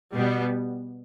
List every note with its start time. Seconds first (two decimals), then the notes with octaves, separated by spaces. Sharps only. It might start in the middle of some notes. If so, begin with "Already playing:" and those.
0.15 B2 G3 B3